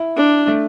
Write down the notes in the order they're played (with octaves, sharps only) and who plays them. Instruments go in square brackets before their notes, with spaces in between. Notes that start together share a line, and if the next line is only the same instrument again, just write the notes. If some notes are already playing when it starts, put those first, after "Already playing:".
Already playing: [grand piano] E4
[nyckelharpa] D4
[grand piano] A3